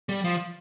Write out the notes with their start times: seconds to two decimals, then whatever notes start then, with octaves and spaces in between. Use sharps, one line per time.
0.09 G3
0.24 F3